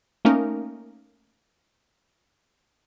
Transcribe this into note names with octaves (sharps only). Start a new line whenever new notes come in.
A3 A#3 C#4 D#4 A#4